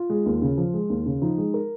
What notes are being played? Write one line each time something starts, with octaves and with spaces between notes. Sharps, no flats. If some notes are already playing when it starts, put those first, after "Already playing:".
Already playing: F4
G#3
D#2
C#3
F3
G#3
D#2
C#3
F3 D#4
G#3
A#4